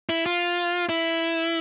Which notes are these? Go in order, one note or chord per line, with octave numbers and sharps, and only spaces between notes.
E4
F4
E4